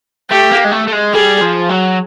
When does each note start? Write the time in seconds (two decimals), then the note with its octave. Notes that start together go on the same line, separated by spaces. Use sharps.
0.31 A3 G4
0.52 A#3
0.64 G#3
0.72 A3
0.88 A3
0.92 G#3
1.14 G3 G#4
1.41 F3
1.69 F#3